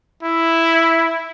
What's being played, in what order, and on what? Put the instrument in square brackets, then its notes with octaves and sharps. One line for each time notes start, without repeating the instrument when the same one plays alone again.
[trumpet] E4